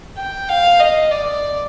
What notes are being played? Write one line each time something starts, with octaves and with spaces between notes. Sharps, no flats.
G5
F5
D#5
D5